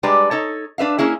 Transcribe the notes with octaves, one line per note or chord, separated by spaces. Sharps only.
G3 G#3 D4 B4 D5 A#5
D#4 A4 C#5
D4 B4 E5 F5
A#3 C#4 E4 G#4